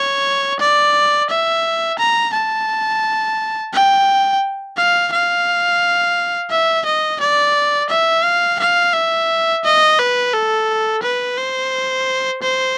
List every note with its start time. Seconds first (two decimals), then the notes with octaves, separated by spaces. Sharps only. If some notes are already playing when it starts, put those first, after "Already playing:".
Already playing: C#5
0.60 D5
1.29 E5
1.99 A#5
2.34 A5
3.73 G5
4.77 F5
5.12 F5
6.51 E5
6.86 D#5
7.20 D5
7.90 E5
8.24 F5
8.59 F5
8.94 E5
9.64 D#5
9.99 B4
10.33 A4
11.03 B4
11.37 C5
12.42 C5